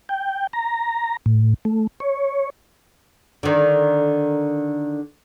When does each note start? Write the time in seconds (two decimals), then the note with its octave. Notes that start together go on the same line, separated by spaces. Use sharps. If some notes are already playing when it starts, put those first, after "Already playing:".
0.09 G5
0.53 A#5
1.26 A2
1.65 A3
2.00 C#5
3.43 D3 D#3